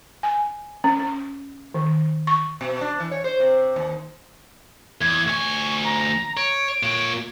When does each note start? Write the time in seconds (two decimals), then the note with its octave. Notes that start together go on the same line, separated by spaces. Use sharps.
0.23 G#5
0.84 C#4
0.99 C#4
1.74 D#3
2.27 C#6
2.61 B2
2.81 D4
3.00 E3
3.11 C#5
3.24 C5
3.40 C3
3.76 D#2
5.01 E2 G#6
5.27 D2 G#5 C#6
5.85 A#5
6.37 C#5 D7
6.83 A#2 C#5